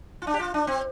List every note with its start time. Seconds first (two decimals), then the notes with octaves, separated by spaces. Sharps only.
0.22 F4
0.27 D4
0.34 G4
0.40 F4
0.54 D4
0.67 C4